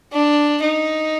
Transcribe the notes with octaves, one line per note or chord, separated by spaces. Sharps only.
D4
D#4